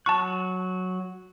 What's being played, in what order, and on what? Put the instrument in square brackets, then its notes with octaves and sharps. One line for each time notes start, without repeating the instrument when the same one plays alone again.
[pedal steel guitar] F#3 F#4 F#6 [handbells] A5 C#6